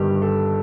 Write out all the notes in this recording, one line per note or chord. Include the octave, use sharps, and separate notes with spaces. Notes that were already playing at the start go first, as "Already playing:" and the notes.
Already playing: G1 G2 D#3 G3 G4
A4